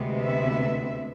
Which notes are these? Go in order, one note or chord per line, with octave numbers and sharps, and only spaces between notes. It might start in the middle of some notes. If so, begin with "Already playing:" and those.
Already playing: D2 C3 G#3 B3
E5